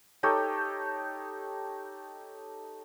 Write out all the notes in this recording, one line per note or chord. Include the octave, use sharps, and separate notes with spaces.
D#4 G4 A4 C#5